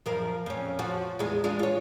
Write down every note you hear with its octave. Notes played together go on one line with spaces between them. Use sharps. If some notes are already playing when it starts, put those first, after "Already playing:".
F#2 F3 A#4
F2 C#4
F3 F#4
E2 G#3
G#3 D4 F4
F4 C#5